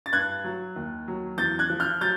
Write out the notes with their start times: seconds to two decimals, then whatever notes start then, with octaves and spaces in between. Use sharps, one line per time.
0.06 A6
0.13 G2 F#6 G#6
0.44 F#3
0.76 D#2
1.08 F#3
1.38 E2 G6 A6
1.59 F#6 G#6
1.70 F3
1.80 F6 G6
2.01 F#3 G6 A6